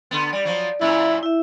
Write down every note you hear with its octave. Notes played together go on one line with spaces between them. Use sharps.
D3 B3
G3 D5
F3 F#3
F#2 A#2 E4
E4 E5